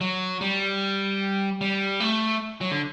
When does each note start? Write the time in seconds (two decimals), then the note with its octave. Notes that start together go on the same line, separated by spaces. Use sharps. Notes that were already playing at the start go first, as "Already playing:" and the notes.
0.01 F#3
0.41 G3
1.61 G3
2.00 A3
2.61 F#3
2.71 D3